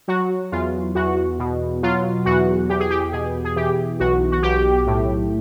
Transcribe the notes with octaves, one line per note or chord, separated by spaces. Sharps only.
F#3 F#4
E2 F4
E2 F#4
B2
F#3 F4
E2 F#4
E2 G4
G#4
G4
B2 G#4
G#4
E3 G4
B1 F#4
F#4
B1 G4
A2